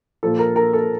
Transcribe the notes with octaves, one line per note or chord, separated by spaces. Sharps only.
A#2 F3 A4
A#4
A#4
A4